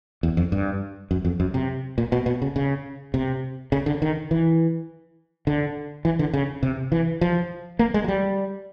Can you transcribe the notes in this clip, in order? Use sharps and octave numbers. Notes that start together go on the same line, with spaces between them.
E2
F2
G2
F#2
F2
F#2
C3
A#2
B2
B2
C#3
C#3
C3
C#3
D3
D#3
E3
D3
E3
D3
C#3
C3
E3
F3
A#3
G#3
F#3
G3